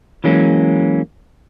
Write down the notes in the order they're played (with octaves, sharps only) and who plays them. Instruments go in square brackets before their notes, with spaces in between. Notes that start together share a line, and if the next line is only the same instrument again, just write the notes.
[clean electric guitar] E3 F#3 G#3 A#3 C#4